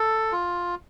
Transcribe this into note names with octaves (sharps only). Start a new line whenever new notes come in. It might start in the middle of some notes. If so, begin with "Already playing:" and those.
Already playing: A4
F4